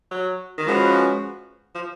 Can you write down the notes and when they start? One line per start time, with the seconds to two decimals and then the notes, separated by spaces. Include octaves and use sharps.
0.11 F#3
0.58 D#3
0.67 F3 G#3 C#4 F#4 B4
1.75 F3